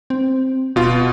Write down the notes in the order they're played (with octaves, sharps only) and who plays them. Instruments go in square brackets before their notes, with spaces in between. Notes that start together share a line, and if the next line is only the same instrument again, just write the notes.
[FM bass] C4
[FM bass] D1 [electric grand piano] B2 F4